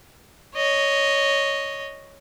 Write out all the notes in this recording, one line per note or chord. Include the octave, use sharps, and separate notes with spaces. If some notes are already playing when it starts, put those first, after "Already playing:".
C#5 D#5